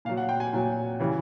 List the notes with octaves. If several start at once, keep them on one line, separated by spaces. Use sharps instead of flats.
A#2 F#3 F5
F#5
G5
G#5
A#2 F#3
C#3 E3 G3